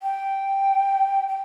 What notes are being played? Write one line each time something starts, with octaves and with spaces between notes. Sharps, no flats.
G5
G5